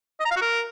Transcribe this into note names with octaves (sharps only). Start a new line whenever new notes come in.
D#5
A#5
F5
F#4
A#4